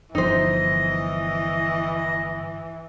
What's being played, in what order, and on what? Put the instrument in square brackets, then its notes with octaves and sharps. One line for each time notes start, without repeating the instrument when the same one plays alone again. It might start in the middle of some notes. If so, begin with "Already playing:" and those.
[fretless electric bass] G1 F3 [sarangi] E3 [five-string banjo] D#4 C5 [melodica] D#5